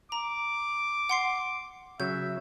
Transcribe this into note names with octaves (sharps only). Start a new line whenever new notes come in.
A#5 D6
F#5 C6 C7
C#3 F#3 E5 G6